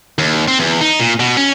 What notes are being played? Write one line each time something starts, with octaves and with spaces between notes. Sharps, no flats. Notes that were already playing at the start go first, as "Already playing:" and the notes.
D#2
C4
E2
D#4
A#2
B2
C#4